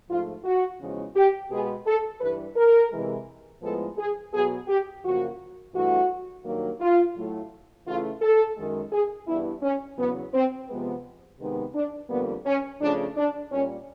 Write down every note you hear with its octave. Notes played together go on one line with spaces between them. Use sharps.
G#2 F3 A3 F4
F#4
E2 C#3 F3 G#3
G4
B2 G#3 B3 G#4
A4
G2 E3 G3 B4
A#4
C3 E3 G#3
A2 F3 G#3 B3 A4
G#4
B2 F#3 B3 G#4
G4
F#2 C#3 F3 A#3 F#4
G2 E3 A3 F#4
G2 D#3 F#3 A#3
F4
A2 F#3 A3
C#3 E3 A3 F4
A4
F#2 D#3 G#3
G#4
G2 E3 G3 B3 E4
C#4
E2 C#3 F#3 B3
C4
C3 F3 G#3 B3
C3 D#3 G#3 B3
D4
F2 D3 G3 A#3 B3
C#4
C#3 F3 A3 D4
D4
A#2 G3 A#3 C#4